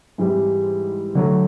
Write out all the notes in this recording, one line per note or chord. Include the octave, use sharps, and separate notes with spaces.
G#2 E3 G3 C4 E4
D3 F#3 A3